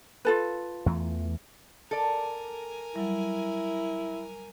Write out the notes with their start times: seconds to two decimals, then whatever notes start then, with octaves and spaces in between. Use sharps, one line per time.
0.25 F4 A4 B4
0.86 E2 E3 A3
1.91 A4 A#4 D5 G#5
2.96 F#3 G3 E4